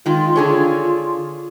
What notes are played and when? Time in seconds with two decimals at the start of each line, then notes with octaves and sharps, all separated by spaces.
0.06 D#3 G#3 F4
0.36 D3 F4 G#4 C#5